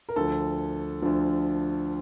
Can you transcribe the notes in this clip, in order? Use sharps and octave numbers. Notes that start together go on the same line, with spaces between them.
A#4
D2 D3 F3 A4
D2 D3 F3